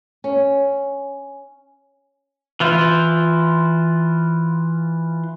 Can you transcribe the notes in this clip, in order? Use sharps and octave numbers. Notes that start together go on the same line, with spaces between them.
C#4
E3 F4 C5